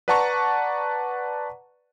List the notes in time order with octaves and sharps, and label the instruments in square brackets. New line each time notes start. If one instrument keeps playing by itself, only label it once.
[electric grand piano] B4 D5 F#5 A5 A#5 C#6